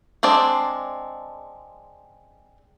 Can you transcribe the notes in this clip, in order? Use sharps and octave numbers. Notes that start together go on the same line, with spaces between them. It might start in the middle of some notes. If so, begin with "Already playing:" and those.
G#3 C4 D4 D5